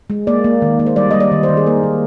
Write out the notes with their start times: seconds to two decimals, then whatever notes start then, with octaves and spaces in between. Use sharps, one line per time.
0.10 G#3
0.27 A#3 D5
0.44 A#3
0.62 D#3
0.79 A#3
0.86 C5
0.96 G3 D5
1.11 G3 D#5
1.20 D5
1.31 D#3
1.43 C5
1.49 D#3
1.57 G#4
1.67 A#3 A#4
1.84 D#3